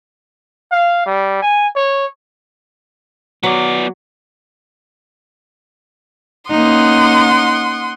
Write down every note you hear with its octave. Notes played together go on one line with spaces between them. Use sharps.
F5
G3
G#5
C#5
F#3 B3 D5
A#3 C#4 D#4 F#5 C6 D#6